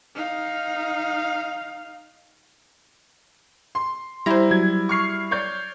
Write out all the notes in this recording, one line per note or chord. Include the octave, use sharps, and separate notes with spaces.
D#4 F5
C6
G3 E4 C5 A#5
F#3 G#6
C#6 F6 C7
C#5 D5 G6